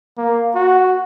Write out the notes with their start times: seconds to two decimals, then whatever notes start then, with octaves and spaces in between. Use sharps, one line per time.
0.18 A#3
0.55 F#4